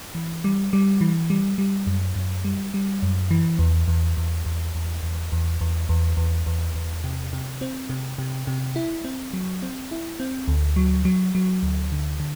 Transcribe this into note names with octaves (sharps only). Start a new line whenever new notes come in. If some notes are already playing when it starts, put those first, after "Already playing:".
E3
G3
G3
E3
G3
G3
F#2
F#2
G3
G3
F#2
E3
E2
E2
E2
E2
E2
E2
E2
E2
E2
E2
E2
E2
C3
C3
C4
C3
C3
C3
E4
C4
F#3
C4
E4
C4
D2
F#3
F#3
F#3
D2
D3
D3